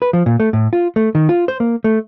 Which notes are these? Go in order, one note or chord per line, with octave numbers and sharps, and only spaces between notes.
B4
F3
A#2
A3
A2
F4
A3
D#3
F4
C5
A#3
A3